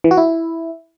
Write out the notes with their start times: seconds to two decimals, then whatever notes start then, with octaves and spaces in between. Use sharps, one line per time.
0.04 E3
0.11 F#4
0.17 E4